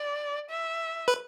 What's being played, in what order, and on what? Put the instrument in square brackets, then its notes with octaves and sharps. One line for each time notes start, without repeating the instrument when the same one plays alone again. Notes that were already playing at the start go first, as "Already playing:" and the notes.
Already playing: [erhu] D5
E5
[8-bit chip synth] B4